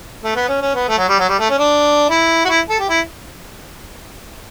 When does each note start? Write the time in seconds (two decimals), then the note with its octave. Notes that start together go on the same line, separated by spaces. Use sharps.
0.24 A3
0.35 B3
0.48 C#4
0.62 C#4
0.75 B3
0.89 A3
0.98 F#3
1.09 G3
1.19 F#3
1.29 G3
1.39 A3
1.50 C#4
1.58 D4
2.10 E4
2.45 F#4
2.49 E4
2.69 A4
2.79 G4
2.89 E4